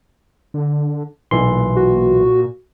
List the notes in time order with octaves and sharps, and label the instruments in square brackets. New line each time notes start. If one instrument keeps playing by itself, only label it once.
[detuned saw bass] D3
[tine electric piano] B1 E3 C6 [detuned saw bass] A#2
[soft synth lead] F#4